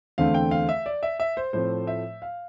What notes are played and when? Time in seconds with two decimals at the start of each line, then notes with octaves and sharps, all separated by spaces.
0.18 E2 D3 A3 C4 F5
0.34 G5
0.51 F5
0.69 E5
0.86 D5
1.03 E5
1.20 E5
1.37 C5
1.53 A2 F3 A3 C4 C5
1.87 E5
2.22 F5